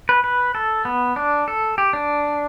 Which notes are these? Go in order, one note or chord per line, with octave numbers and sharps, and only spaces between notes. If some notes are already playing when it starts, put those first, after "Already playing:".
B4
B4
A4
B3
D4
A4
G4
D4